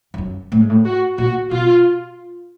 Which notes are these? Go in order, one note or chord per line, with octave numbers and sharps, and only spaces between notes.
F2
F#2
A2
G#2
A2
F#4
A#2 F#4
B2 F4